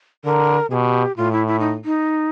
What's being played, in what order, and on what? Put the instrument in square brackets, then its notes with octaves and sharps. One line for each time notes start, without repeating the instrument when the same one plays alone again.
[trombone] D3 [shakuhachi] A#4
[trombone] B2 [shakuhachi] G4 G#4
[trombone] A2 [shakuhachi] F4
[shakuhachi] E4
E4
D#4
D#4